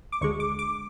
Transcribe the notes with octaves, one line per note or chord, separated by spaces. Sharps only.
D6
D2 D3 G#3 C#6
D6
D6